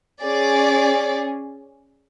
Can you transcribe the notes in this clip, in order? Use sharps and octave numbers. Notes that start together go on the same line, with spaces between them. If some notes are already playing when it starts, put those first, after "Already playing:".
C#4 G#4 D5